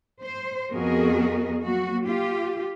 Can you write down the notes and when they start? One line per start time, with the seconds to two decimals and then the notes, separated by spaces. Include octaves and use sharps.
0.23 C5
0.72 F2 B3 F#4 G#4 A#4 D#5
1.63 F#3 A#3 F#4
2.06 F4 G4